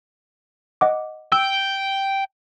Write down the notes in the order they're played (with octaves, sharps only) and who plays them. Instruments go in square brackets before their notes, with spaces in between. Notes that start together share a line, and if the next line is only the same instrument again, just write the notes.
[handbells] D#5 F#5 D6
[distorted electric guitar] G5 [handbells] E6